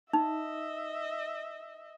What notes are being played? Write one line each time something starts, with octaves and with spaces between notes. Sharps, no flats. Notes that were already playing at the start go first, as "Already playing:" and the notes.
D#4 D#5 E5